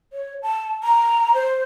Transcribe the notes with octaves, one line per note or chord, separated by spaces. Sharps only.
C#5
A5
A#5
C5